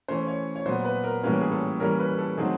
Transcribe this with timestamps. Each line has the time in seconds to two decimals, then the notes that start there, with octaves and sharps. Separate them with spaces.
0.08 E3 A3 C#4 C5
0.27 C#5
0.56 C#5
0.66 A#2 F#3 B3 C5
0.85 B4
1.04 A#4
1.23 A2 E3 G3 A#3 C#4 B4
1.41 G#4
1.52 A4
1.80 E3 G3 A#3 C#4 A#4
1.99 B4
2.18 A4
2.37 D#3 F#3 A3 C4 G#4